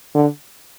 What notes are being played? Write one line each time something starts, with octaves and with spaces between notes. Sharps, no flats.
D3